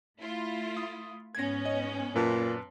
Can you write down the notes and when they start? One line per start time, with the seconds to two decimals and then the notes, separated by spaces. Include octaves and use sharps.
0.19 A3 E4 F4
0.77 D#6
1.35 G#2 B3 C#4 G#6 A#6
1.65 D#5
2.15 F#2 A#2 B4 A5